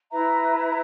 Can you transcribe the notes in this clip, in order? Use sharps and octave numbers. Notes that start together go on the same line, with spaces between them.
E4 B4 E5 A#5